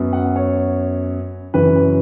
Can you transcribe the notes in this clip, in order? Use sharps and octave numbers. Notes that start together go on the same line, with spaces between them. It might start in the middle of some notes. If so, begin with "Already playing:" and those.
Already playing: F#2 F#3 B3
F#5
C#5
F#2 C#3 E3 B4